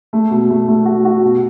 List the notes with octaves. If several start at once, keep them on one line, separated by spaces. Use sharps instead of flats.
A3
B2
A3
A3
F#4
F#4
B2